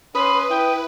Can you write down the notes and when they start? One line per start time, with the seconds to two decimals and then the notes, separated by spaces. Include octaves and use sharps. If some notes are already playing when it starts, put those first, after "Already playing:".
0.15 C#4 B4 B5 C6 D#6
0.50 E4 G5